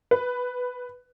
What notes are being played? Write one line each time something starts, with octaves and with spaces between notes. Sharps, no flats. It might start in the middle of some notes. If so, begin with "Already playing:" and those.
B4